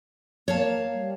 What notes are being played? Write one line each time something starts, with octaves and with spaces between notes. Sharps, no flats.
A#3 C#5 F5 A5
G3